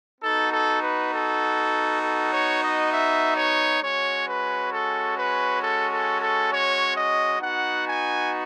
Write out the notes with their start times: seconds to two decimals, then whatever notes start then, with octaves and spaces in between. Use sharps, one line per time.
0.21 B3 D#4 F#4 A4
0.51 A4
0.81 B4
1.11 A4
2.01 A4
2.32 C#5
2.61 D#5
2.91 E5
3.36 C#5
3.80 G#3 C#4 F#4 C#5
4.27 B4
4.71 A4
5.16 B4
5.61 A4
5.91 A4
6.21 A4
6.51 C#5
6.96 D#5
7.40 B3 D#4 F#4 F#5
7.86 G#5